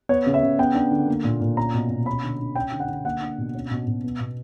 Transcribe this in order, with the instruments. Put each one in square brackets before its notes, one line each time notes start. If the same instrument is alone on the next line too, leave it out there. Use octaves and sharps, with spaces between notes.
[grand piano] B3 C#5
C#3
E5
C#3
B3 G5
D4
D3
A#3
A#2
A#2
C#4 A#5
B2
B2
C#4 B5
D3
D3
C#4 G5
D3
F#5
D3
A#3 F#5
D4
B2
C#4
B2
B2
B3
B2